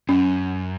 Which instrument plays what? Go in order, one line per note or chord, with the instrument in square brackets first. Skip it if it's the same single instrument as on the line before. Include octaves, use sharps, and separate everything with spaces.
[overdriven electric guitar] F#2 [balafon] C#4